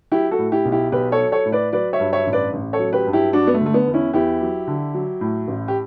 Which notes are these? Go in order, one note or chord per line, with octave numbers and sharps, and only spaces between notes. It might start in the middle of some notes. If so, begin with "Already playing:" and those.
F#3 E4 G4
F#4 A4
A2
E4 G4
B1
E4 G4
B1 G4 B4
A4 C#5
F#3
A4 C#5
A2
B4 D5
F#3 B4 D5
C#5 E5
G2
C#5 E5
A1
B4 D5
A1
A4 C#5
F#3
G4 B4
G2
E4 G4
F#3 D4 F#4
B3
A3
D3
A3
B3
E2
C#4 E4
E2 E4 G4
F#3
D3
F#3
A2
A1
G4